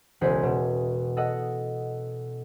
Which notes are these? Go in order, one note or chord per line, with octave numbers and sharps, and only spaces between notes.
E1 C#2 F#4 G#4 C5 B6
B2
A4 D#5 F#5